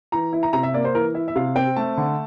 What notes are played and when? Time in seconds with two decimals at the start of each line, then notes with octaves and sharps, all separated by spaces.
0.12 E3 A#5
0.33 E4
0.43 A#5
0.53 C3 A#5
0.63 E5
0.74 A#3 D5
0.85 C5
0.94 E3 A#4
1.14 E4 E5
1.28 E5
1.36 C3 F5
1.56 C4 G5
1.76 A3 A5
1.97 D3